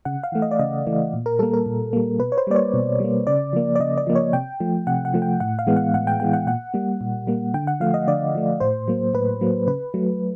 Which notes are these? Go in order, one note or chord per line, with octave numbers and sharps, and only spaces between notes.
C#3 F#5
F5
E3 A3
D#5
D5
C#3 D#5
E3 A3
A#2
A#4
G3 A#3 A4
A#4
A#2
G3 A#3
B2 B4
C#5
C5
G3 A#3 D5
C#5
B2
G3 A#3
C#3 D5
F3 A#3
D5
C#3 D#5
D5
F3 A#3
C#5
C3 G5
F3 A3
C3 F#5
F#5
F3 A3
G5
A2 F#5
F5
E3 G#3 B3
F#5
A2 F#5
G5
E3 G#3 B3 G5
F#5
A#2 F#5
G3 A#3
A#2
G3 A#3
D3 G5
F#5
F3 A3 F5
D#5
D3 D5
F3 A3
A2 C5
F#3 A#3
A2 B4
F#3 A#3
C#3 B4
F#3 A3